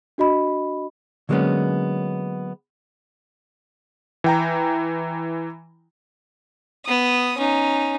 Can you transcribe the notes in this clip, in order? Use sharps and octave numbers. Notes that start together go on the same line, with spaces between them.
D4 F#4 D#5 B5
D3 F#3 G#3 A#3 B3 C#4
E3 G5 A#5
B3 D#6
C#4 D#4